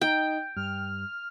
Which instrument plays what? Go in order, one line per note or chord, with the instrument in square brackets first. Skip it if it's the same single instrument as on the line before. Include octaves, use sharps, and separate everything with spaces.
[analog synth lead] D#4 [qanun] G5
[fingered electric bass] G2 [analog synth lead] F6